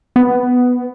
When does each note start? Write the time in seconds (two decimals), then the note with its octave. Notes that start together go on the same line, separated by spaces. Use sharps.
0.16 B3